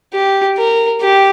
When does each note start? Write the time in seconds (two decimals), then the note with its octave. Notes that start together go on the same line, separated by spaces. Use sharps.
0.13 G4
0.57 A#4
1.01 G4